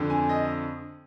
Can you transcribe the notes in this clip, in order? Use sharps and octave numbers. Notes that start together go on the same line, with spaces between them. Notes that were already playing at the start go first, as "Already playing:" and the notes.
Already playing: F2 D3
G#5
D#5